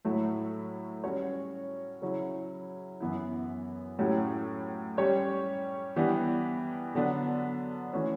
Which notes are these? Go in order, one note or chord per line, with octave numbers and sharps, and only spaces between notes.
A2 F#3 A3 E4
G3 C#4 F#4 C#5
C#3 F#3 C#4 E4
F#2 E3 B3 E4
A2 F#3 C#4 E4 G4
G3 C#4 G4 C#5
E3 G3 B3 D4 G4
D3 F#3 B3 D4
E3 A3 C#4 F#4